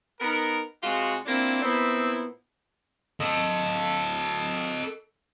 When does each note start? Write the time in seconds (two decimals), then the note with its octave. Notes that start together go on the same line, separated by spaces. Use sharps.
0.21 B3 D#4 A#4
0.83 C3 G#3 F4 F#4
1.26 A#3 C4 D4 E4 F4
1.62 A#2 B3 C4 E4
3.20 A4 D#5